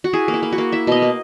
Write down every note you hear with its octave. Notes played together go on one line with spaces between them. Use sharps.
F#4
E4 G#4
A#3
E4
A#3
F#4
A#3
E4 E5
B2 D#5
A#3